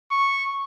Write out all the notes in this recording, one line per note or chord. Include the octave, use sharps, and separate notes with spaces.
C#6